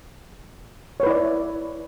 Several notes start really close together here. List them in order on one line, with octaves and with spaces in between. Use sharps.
C#5 B4 E4 D5 E5